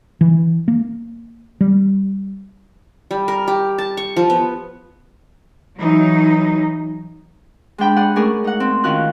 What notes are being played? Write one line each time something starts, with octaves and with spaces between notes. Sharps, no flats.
E3
A#3
G3
G3
A#4
G4
A5
C#6
F3
B3
E3 F#3 D#4
G#3 D4 G5 B5
G#4 D5 F#5
A3 C#4 G#4 A#4 D5 G#5
D#4 F#5
C4
D#3 C#4 F4 F#4 F5 F#6